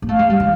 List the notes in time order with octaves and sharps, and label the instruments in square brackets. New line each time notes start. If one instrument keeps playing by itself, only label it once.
[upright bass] A#3
[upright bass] A3 [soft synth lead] F5
[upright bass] G#3
G3
E3